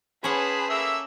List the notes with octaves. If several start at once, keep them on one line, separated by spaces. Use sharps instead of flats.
C#4 G#4 B4 C5 F#5 A5 B5
A3 A#3 E5 E6